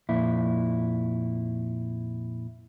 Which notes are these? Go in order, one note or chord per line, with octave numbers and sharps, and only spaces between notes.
F2 A#2 E4